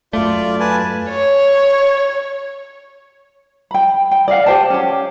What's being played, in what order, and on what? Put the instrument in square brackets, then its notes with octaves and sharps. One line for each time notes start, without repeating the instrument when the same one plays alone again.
[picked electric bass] F#2 A3 [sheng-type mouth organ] F4 D5
[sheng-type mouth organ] B4 G#5 A5
[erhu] C#5
[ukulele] G5 B5
G5
D5 D#5 F5 F#5
G4 C5 G5 A5
C#4 G4